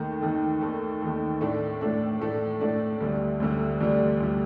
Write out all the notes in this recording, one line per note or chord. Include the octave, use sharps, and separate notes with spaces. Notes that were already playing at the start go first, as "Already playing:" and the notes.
Already playing: D#2 D#3 A3
D#2 D#3 A3
D#2 D#3 A3
D#2 D#3 A3
A2 A3 D4
A2 A3 D4
A2 A3 D4
A2 A3 D4
D2 D3 G3
D2 D3 G3
D2 D3 G3
D2 D3 G3